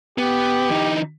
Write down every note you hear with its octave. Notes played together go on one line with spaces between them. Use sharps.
B3 G4
E3 D#4